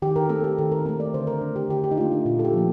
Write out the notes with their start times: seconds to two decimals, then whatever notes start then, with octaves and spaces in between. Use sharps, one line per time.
0.02 D#3 G4
0.16 A#4
0.29 A3 C4 A4
0.44 G4
0.58 D#3 A4
0.72 A#4
0.85 A3 C4 A#4
1.00 D5
1.14 D3 C5
1.27 A#4
1.41 A3 D4
1.56 G4
1.69 D3 G4
1.84 G4
1.91 D#4
1.97 A3 D4 F4
2.12 D#4
2.25 A#2 F4
2.39 A4
2.45 G4
2.53 F3 A#3